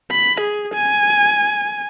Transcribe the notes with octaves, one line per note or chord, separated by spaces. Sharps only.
B5
G#4
G#5